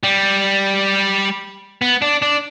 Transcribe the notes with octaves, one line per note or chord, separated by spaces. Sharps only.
G3
B3
D4
D4